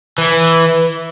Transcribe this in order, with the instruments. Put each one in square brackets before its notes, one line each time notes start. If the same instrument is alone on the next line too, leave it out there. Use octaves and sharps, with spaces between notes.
[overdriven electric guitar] E3